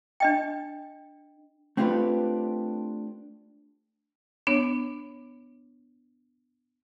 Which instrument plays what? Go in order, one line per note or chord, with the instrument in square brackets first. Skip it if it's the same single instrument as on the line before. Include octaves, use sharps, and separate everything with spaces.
[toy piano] D4 D#5 G5
[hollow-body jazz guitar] A3 C4 D4 F4 G4 B4
[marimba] B3 D4 C#5